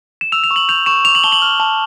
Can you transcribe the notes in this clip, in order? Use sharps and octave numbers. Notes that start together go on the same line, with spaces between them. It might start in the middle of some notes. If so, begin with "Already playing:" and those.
E7
E6 F7
F7
C#6
F#7
G6 F7
C#6 E7
D6 F7
F#7
A5 G7
F#7
F6
A5